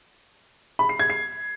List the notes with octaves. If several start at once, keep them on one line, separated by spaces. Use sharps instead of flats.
B5
C7
G#6
C7